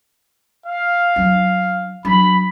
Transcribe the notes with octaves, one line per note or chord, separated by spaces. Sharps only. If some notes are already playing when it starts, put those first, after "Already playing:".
F5
F#3 D4
F#3 D4 B5